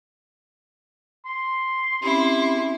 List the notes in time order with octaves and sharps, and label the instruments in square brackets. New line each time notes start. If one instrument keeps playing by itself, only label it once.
[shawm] C6
[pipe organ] C4 C#4 G4 [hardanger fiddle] E4